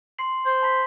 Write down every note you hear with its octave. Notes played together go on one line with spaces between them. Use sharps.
C6 C7 F#7
C5
A5 B5 B6